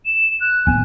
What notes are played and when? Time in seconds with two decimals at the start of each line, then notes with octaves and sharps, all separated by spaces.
0.06 E7
0.41 F#6
0.67 D1 B3 G#5